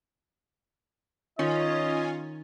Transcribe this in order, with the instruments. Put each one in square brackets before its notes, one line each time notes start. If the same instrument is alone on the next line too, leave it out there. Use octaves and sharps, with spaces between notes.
[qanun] D#3 [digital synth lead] C#4 [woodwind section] F4 [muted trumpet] D#5